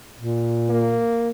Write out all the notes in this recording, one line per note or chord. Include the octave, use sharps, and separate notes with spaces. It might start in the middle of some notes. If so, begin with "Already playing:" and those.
A#2
A#3